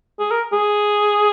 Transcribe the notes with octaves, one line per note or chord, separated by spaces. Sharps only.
G#4
A#4
G#4